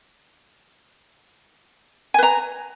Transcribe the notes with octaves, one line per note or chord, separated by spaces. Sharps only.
B4 G#5 A#5